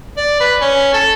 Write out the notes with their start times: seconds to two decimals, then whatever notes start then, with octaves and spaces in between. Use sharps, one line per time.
0.17 D5
0.40 B4
0.61 C#4
0.93 A4